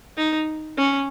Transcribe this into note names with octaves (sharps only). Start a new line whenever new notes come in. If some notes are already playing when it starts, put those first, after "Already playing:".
D#4
C#4